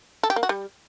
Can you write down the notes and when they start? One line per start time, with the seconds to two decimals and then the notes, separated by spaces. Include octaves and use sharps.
0.23 A4
0.30 G4
0.36 A#3
0.43 F#4
0.49 G3